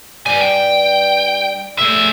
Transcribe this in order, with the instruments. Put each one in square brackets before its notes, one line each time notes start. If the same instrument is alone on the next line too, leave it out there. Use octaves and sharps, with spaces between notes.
[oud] G2 G3 [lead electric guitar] D4 G#5
[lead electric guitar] G5
[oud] F#2 G3 A3 [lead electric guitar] G#4 E5